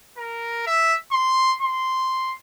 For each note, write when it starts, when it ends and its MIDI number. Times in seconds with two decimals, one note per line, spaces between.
0.17 0.62 70
0.67 0.96 76
1.12 1.56 84
1.62 2.33 84